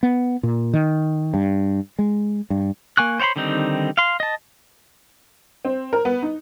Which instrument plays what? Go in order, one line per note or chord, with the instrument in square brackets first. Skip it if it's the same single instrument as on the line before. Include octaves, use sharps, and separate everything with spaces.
[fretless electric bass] B3
A#2
D#3
G2
G#3
G2
[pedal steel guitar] A#3 G#5 C#6 F#6
C5 C#5 F#5 B5 C6
D3 D#3 G3 C4 D#4
F5 C6
D#5 A5
[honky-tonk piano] C4
A#4
B3
D#4